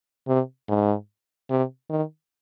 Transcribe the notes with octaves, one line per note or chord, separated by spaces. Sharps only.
C3
G#2
C3
D#3